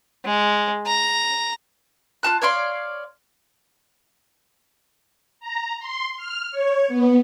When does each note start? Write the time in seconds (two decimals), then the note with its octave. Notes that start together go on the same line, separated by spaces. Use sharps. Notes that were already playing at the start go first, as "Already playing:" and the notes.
0.25 G#3
0.86 A#5
2.23 F4 F#4 A5 F#6
2.42 C#5 D5 F5 C6
5.40 A#5
5.79 C6
6.17 F6
6.52 C#5
6.88 B3